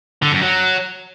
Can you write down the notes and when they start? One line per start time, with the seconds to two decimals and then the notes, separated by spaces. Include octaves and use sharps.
0.22 D3
0.32 F#2
0.42 F#3